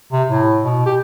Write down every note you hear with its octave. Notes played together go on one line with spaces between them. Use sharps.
C3
A2
B2
G4